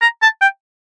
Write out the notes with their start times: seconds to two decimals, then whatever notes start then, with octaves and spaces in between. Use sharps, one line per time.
0.02 A#5
0.22 A5
0.41 G5